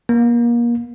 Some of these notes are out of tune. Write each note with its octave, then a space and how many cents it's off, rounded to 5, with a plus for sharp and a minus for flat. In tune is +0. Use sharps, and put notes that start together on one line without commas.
A#3 +30